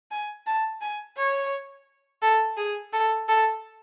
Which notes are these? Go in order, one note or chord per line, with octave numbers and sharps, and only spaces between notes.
G#5
A5
G#5
C#5
A4
G#4
A4
A4